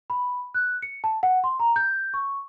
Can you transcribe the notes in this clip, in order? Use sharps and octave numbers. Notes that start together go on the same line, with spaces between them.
B5
F#6
C#7
A5
F#5
C6
A#5
G6
C#6